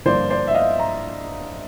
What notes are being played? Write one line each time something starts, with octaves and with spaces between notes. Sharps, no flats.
G2 D3 F3 A#3 C5 D5
C5 D5
E5
D#5 F5
A#5